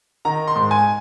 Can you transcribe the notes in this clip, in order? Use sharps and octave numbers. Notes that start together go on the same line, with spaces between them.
D#3 A#5
C6
G#2
G#5